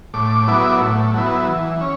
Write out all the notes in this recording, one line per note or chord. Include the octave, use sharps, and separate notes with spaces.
A2 D6
F#3 B3 E4
A2
F#3 B3 E4
E3
C#4